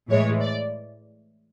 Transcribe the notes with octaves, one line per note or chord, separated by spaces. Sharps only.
A2 E3 G#3 C#5
D5